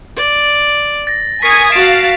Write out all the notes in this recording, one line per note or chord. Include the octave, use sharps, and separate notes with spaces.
D5
A6 A#6
A#4 G#5 C#6 D#6 G#6 B6 C7
F#4 F5 A5 C7 D7 E7